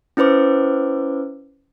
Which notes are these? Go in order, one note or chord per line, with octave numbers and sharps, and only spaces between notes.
C#4 E4 B4 C5 D6